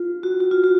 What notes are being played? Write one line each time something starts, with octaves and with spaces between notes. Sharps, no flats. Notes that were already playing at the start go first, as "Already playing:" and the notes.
Already playing: F4
F#4
F#4
F4
F#4